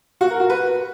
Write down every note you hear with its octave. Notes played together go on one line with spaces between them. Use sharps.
F#4
A#4
F#4
B4